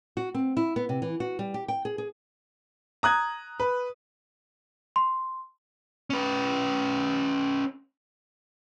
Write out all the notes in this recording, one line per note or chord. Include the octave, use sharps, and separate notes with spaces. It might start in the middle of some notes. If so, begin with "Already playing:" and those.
F#4
C4
E4
B3
C3
E3
F#4
G3
G4
G5
G#4
G#4
A#5 D#6 F#6 G#6
B4
C6
C#4 B4